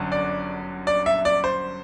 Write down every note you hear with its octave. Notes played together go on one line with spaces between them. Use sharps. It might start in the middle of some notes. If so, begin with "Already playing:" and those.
Already playing: G1 F#2 D3
D5
D5
E5
D5
C5